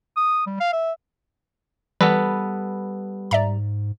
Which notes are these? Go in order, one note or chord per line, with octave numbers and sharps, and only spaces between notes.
D#6
G3
F5
E5
E3 G3 B3 A4 B4
G#2 D5 E5 A#5